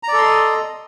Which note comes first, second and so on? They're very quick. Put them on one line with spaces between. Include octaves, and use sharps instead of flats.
A#5 D5 A4 C6 D#5